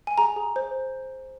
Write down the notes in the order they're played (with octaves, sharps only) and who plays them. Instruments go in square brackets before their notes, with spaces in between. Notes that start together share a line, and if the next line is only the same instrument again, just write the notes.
[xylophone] G#5
G#4 A#5
G#4
C5